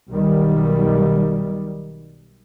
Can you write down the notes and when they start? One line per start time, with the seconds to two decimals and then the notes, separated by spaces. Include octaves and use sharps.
0.13 B1 D#3 G3